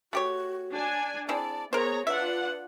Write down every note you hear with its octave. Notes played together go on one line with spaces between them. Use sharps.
A3 F#4 G4 C#5
D4 G#5
C4 E4 G#4 D5 A5
B3 G#4 A#4 C5 C#5 A#5
D4 F4 B4 E5 F#5